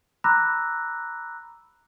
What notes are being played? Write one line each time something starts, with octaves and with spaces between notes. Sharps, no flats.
A#5 B5 D6 E6 F#6 A#6